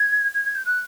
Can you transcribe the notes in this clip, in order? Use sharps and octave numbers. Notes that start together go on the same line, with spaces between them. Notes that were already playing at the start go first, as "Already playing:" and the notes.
Already playing: G#6
G#6
G#6
G6
F#6